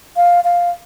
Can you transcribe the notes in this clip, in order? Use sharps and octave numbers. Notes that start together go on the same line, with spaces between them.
F5
F5